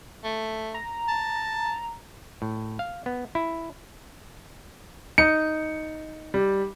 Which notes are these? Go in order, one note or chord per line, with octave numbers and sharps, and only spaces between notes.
A3
A#5
A5
A2
F5
B3
E4
D#4 C#7
G3